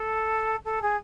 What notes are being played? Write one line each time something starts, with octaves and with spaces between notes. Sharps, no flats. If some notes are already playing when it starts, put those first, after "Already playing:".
Already playing: A4
A4
G#4